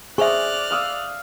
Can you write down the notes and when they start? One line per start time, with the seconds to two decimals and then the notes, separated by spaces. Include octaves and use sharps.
0.18 G#4 C5 D5 E5 C#6 F6 F#6
0.71 F5 D#6 E6